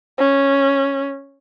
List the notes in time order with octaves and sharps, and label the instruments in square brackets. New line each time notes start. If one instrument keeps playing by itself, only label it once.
[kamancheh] C#4